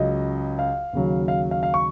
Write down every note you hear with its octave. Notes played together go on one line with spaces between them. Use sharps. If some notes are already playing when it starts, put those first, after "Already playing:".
Already playing: C#2 C#3 F#3 D#5
F5
D#2 C#3 F#3
F5
F5
F5
C#6